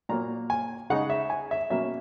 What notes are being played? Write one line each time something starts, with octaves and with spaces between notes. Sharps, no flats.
A#2 F#3 A#3 A#5
G#5
C#3 G#3 D#4 F#5
E5
G#5
E5
B2 F#3 A#3 C#4 E5